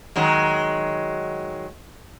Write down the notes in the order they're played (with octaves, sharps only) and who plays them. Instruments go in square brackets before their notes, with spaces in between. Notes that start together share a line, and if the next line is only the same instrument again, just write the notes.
[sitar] D#3 F#3 G#3